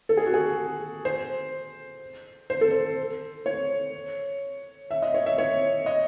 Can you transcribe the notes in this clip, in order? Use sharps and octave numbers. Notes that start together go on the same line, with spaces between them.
A4
G#4
F#4
G#4
C5
C5
A4
C5
C#5
E5
D#5
C#5
E5
C#5
D#5